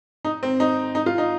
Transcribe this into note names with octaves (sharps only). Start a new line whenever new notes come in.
D#4
C4
D#4
D#4
F4
D#4